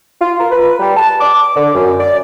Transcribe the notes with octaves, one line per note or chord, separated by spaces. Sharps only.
F4
A#4
B4
G3
A5
D6
D3
F#2
D5